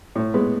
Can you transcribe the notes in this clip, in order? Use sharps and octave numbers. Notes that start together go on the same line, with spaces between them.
A2
G#3 B3